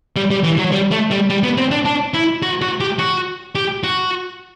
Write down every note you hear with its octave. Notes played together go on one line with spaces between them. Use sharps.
G3
G3
E3
F#3
G3
A3
G3
G3
B3
C4
D4
D4
E4
F#4
F#4
G4
F#4
G4
F#4